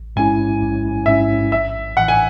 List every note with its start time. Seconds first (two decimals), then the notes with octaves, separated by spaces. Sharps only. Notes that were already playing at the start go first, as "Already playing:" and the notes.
Already playing: A1
0.16 G#2 G#3 C#4 E4 G#5
0.61 A1
1.06 G#2 G#3 C#4 E4 E5
1.51 A1 E5
1.96 A2 E3 F#5
2.08 G#5